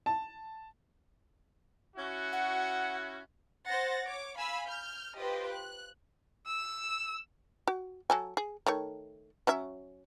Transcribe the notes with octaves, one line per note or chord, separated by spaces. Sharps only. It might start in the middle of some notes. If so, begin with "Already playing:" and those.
A5
C#4 E4 F#4
F#5
C5 F#5 A6 A#6
C#5 D6
F5 G#5 B5 E6
F6 G6
F4 G4 B4 C5 D#5
F#6
E6
F#4
F#3 A4 G#5
G#4
D#3 A3 C#5
F#3 C#4 E5